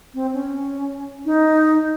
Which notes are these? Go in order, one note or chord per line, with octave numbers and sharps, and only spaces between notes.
C4
C#4
D#4